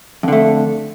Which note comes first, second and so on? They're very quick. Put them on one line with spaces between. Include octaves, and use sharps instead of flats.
F2 D3 A3